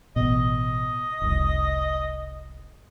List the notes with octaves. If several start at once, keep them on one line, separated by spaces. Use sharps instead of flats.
A1 B2 D#5
F1 C2